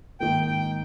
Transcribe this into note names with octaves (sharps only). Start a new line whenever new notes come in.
G#2 D#3 A#3 G5
G5